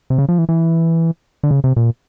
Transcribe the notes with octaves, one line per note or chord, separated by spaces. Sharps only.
C3
C#3
F3
E3
E3
D3
C#3
C3
A#2